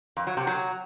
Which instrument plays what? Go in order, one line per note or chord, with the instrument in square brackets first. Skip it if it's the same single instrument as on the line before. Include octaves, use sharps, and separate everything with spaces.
[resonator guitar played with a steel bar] F2
F#3
C3
F#3